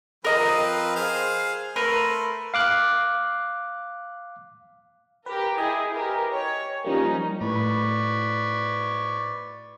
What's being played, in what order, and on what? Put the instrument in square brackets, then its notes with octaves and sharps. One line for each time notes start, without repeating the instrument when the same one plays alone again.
[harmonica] F3 C4 B4 [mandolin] A#4 D#5 A#5
[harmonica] G#4 C5 F5
[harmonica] A3 [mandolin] A#4 B4 C6
[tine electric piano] F5 D6 F#6
[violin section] G4 A#4 [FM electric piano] B4
[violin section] E4 G#4 [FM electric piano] D#5 G5 G#5
[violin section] G4 A#4 B4
C#5
[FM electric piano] F3 G3 A#3 [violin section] C#4 D#4
[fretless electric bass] A2 [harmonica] B4 D5 C#6